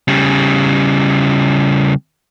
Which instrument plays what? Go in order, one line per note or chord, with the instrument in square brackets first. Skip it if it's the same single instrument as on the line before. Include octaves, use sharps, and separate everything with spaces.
[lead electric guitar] C#3 G3